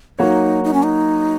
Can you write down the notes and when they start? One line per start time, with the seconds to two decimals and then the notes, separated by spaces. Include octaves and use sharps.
0.19 F#3 A#3 D#4 F#4 C#5
0.64 D#4
0.73 C#4
0.83 D#4